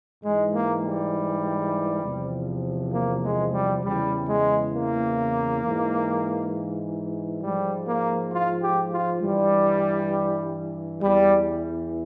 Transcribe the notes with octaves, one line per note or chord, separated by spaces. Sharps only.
G#2 E3 G#3
A#3
G3
E2 C3 F3
A#3
G#3
G3
E2 C#3 E3 G3
G#3
A#3
G#2 E3
G#2 F3 G3
A#3
F4
G4
F4
G2 E3 G3
E2 E3 G3